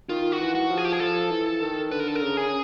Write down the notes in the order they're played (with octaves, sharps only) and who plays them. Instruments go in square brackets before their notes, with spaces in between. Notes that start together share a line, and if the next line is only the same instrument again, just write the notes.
[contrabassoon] D#3 [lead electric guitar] F4
[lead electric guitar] F#4
[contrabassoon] E3
[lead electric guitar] F#4
[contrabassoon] F3
[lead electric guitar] G#4
G4
G#4
[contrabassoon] F3 [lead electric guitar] A4
[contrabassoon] E3
D#3
[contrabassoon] D3 [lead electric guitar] B4
[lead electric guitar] A#4
A4
A#4
[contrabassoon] C#3
[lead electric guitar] G#4